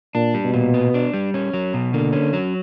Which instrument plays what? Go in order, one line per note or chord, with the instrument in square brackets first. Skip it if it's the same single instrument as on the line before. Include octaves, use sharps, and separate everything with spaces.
[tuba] A#2 [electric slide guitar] D4
[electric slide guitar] G3
[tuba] B2
[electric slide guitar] A#2
B3
D4
G3
C#4
F#3
B2
[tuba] D3 [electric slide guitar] A#3
[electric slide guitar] C#4
F#3